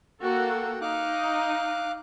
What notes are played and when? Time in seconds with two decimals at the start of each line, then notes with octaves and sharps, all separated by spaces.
0.22 A#3 F#4 A4 F#5 G5
0.81 D#4 F5 D6 F#6